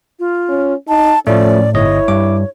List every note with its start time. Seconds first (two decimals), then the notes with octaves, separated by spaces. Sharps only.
0.19 F4
0.49 C#4
0.88 D#4 A5
1.27 A2 F3 A3 C#4 D5
1.74 G1 E4 C#5 D#5
2.08 G2 D6